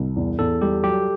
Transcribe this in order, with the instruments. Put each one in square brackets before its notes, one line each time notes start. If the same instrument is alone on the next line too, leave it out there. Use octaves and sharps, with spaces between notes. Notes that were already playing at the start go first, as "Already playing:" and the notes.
Already playing: [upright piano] C2
E2
[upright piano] E2 [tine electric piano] A4
[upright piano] G3 [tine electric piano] G4
[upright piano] F#3 [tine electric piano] G4